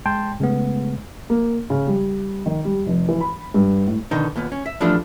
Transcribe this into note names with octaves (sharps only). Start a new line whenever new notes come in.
G#3 G5 A5 C6
C#3 G#3 A3 B3
A#3
C#3
G3
D#3
G3
F1
E3
B5
G2
A2
B2 D3 D#3 D#4
D#2 A#2 B3
C#4
E5
E3 F3 G3 A3 D4 F4